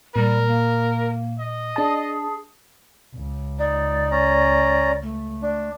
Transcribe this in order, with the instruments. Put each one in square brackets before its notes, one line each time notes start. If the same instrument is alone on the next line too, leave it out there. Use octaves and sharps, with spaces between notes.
[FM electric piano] A#2 [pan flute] G3 [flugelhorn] A#4
[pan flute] A#3
[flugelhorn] D#5
[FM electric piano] D4 A5 [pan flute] G#4
[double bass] C#2
[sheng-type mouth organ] D#4 [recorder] D5
[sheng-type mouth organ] C#4 A#5
[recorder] A3
[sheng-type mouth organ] D4